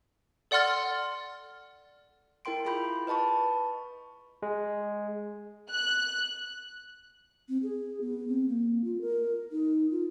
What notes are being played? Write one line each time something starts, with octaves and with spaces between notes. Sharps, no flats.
A4 D5 F#5 C6 F6 A6
E4 A#4 G5 C6 D7
E4 F4 G#4 B5 C6 G6
B4 D#5 A5 B5 C#6
G#3
F#6
C4
G#4
B3
C4
A#3
F4
A#4
D#4
F4